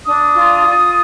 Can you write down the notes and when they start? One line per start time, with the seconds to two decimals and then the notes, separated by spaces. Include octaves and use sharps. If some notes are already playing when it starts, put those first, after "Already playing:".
0.04 D4 D#6
0.35 F4
0.66 F4